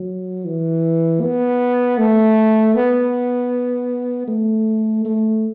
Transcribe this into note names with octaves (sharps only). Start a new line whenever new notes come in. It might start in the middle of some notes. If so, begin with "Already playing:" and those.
Already playing: F#3
E3
B3
A3
B3
A3
A3